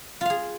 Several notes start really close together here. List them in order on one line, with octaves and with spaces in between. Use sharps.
F4 F5 G#4